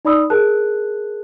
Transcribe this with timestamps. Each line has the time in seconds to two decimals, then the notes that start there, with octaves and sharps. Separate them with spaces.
0.05 D#4 D5 B5 D#6 E6
0.30 G#4 A#4 A5 F#6